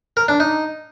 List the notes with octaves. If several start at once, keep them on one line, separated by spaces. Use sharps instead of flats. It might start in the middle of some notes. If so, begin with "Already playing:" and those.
A#4
D4
D#4